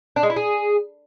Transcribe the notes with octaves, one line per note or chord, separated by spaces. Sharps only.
D4
G#3
E4
G#4